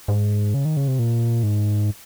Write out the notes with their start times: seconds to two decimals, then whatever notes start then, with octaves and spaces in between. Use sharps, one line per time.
0.08 G#2
0.54 C#3
0.65 D#3
0.77 C#3
0.88 C3
0.99 A#2
1.43 G#2